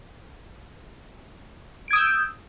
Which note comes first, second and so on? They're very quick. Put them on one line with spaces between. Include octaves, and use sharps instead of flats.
D7 G#6 D#6 E6 G6